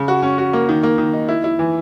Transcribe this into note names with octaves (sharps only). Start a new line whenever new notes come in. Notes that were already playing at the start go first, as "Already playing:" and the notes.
Already playing: C#3
F#4
C#4
F#4
A#3
D#3
A#3
D#3
D#4
E4
E4
E3